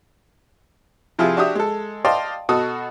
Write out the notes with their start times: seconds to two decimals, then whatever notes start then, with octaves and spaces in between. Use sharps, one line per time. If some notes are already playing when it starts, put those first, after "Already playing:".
1.19 C3 F3 E4 F4 G#4
1.37 D4 F#4 G4 E5 D#6
1.55 G#3 A4
2.05 D5 D#5 F5 G5 A5 C6
2.49 B2 F#4 A4 D#6